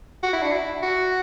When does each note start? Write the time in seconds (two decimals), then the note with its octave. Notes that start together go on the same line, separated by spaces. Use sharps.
0.23 F#4
0.33 E4
0.42 D4
0.52 E4
0.82 F#4